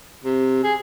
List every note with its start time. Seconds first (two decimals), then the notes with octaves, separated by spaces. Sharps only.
0.24 C3
0.64 G#4